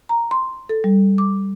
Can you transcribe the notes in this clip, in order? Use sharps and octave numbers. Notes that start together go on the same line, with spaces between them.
A#5
C6
A4
G3
D6